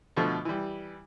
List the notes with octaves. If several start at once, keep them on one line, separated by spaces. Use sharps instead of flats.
B2 D3 F3 A3 C#6
E3 G3